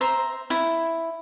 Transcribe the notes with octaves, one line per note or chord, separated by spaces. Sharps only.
C5 E5 A#5
E4